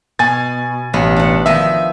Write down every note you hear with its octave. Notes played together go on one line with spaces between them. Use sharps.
B2 G#5 A6
A1 B3
D4 F#5
D#3 F3 D#5 E5